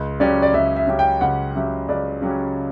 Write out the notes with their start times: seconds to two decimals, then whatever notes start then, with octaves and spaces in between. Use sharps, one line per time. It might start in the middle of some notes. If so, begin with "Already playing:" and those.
Already playing: C#2
0.20 C#3 F#3 C#4 G4 D5
0.42 D5
0.54 C#2 E5
0.76 E5
0.87 C#3 F#3 C#4 G4
0.99 G5
1.21 C#2 F#5
1.55 C#3 F#3 C#4 G4 E5
1.89 C#2 D5
2.22 C#3 F#3 C#4 G4